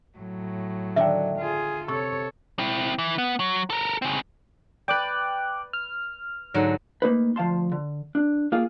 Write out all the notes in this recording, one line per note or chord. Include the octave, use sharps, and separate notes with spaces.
A2 F#3
D3 D#3 D4 E5 G5
F4 G#4
C3 A4 C#5 C#6
C4 E4
E3
B3
F#3
A4 A#4
C#3 C4
B4 D5 G5 D6 F#6
F6
G#2 D3 F#3
A3 A#3 D#4 B4
D2 F3 F5 A5 C6
D3
D4
A#3 F4 G#4 F5